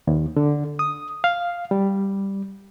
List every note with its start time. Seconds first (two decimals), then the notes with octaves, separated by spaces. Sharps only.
0.07 D#2
0.37 D3
0.79 D#6
1.24 F5
1.71 G3